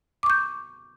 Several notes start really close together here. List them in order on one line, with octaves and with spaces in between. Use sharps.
D6 C#6 G6